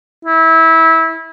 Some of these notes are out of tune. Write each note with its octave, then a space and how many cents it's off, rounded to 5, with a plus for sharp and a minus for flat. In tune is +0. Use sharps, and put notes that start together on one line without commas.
E4 -20